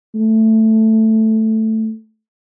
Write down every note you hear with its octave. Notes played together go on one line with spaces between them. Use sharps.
A3